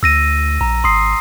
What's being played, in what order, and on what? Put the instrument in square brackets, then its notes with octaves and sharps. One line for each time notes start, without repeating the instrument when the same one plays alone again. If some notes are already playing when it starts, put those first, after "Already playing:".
[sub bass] D2 [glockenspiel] E6 A#6 D#7
[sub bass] A#1 [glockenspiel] A#5
[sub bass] G#1 [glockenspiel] C6 D#6 C7